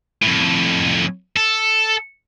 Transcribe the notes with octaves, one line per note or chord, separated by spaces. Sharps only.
F2 A2
A4